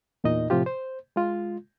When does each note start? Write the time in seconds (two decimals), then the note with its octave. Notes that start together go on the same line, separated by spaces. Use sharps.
0.24 E2 A#2 D#4 D#5
0.50 A2 C3 F3 F4 G4
0.66 C5
1.16 G#3 F4